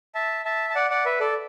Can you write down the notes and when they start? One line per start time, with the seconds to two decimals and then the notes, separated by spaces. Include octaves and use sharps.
0.15 E5 A5
0.45 E5 A5
0.70 A5
0.75 D5 F#5
0.90 D5 F#5
1.05 B4 E5
1.20 A4 D5